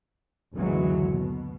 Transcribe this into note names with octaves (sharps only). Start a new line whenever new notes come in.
F#1 D2 E3 F#3 G#3
B2